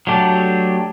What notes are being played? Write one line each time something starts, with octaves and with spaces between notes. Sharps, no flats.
F#3 A3 D4 G4